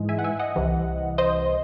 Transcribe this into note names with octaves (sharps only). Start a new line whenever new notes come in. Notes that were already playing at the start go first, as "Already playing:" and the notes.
Already playing: G#2 E3 G#3
E5 G#5
F#5
E5 G#5
D#5 F#5
C2 C3 E3
C5 D#5